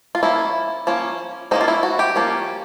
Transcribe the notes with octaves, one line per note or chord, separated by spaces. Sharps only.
F4
F3 A#3 C#4 E4
F3 A#3 C#4
F3 A#3 C#4 D#4
F4
E4
F#4
G4
F3 A#3 C#4